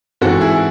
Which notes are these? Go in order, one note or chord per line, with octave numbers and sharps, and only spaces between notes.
G#2 E3 C4 F#4 A4
E4 G#4